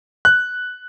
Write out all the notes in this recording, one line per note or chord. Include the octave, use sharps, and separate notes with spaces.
F#6